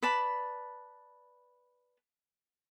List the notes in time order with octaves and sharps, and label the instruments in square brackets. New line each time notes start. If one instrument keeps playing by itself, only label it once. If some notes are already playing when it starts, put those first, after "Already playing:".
[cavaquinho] B4 D5 A5 B5